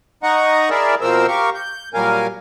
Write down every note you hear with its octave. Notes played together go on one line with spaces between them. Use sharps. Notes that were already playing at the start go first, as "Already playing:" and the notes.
D#4 D#5 F#5 A#5 C#6
E4 G#4 A#4 D5 E5
B2 F3 C4 A#4 C5 E6
G4 A#4 F5 C#6
G6
A#2 F#3 G3 A#4 F5 G#5